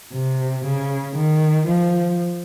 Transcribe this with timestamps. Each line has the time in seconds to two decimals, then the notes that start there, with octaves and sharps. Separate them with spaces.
0.13 C3
0.65 C#3
1.16 D#3
1.67 F3